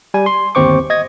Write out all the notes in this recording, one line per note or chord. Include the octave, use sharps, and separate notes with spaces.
G3 G#5
C6
G1 D#2 C4 C5 C#6 D6
D#5 G#6 A#6